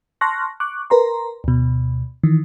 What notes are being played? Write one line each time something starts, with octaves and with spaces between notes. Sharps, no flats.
A5 C6 C#6 F6 F#6 A#6
C#6 D6 F#6
A#4 B4 A#5 C6
D2 B2
D#3 E3